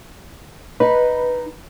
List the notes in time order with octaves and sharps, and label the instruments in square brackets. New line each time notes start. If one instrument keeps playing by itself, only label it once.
[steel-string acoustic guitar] D#4 [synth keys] B4